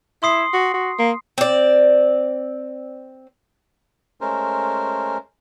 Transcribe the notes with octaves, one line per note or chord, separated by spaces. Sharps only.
E4 C6 D#6 C7
F#4
F#4
A#3
C4 D5
G#3 A3 C#4 A#4 C5